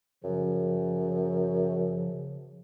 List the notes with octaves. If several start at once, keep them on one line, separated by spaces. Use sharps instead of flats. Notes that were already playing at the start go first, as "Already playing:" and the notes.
F#2 C#3 F3